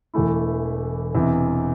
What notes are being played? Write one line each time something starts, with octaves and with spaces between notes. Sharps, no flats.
E1 E2 E3 A3 E4
E1 E2 C3 E3